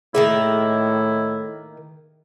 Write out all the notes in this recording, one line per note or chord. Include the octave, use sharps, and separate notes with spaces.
A2 D#3 A#3 E4 G#4 E5